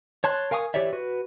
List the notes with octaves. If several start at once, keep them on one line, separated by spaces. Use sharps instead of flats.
C#5 A5 C6 F#6
A#4 F5 G#5 C#6 D#6
E3 G4 C#5 D5 E5
F#4 B4